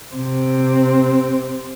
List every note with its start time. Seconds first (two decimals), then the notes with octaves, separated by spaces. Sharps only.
0.14 C3 C4